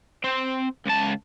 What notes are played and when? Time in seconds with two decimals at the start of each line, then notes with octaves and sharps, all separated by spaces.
0.24 C4
0.86 C#2 A5